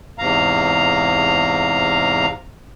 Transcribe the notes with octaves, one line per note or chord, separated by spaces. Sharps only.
E2 G#2 C3 F5 A#5